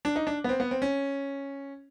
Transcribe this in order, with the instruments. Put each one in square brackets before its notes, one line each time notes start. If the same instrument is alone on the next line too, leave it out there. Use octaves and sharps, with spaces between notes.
[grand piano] D4
D#4
D4
B3
C4
B3
C4
C#4